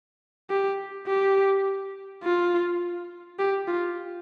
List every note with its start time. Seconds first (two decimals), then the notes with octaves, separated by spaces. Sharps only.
0.50 G4
1.07 G4
2.23 F4
3.39 G4
3.68 F4